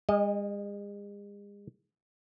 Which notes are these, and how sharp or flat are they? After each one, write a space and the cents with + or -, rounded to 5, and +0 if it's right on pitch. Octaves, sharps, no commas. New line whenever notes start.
G#3 -40 D#5 +0